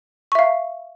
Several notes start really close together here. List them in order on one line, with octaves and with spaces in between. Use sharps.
C#6 E5 F5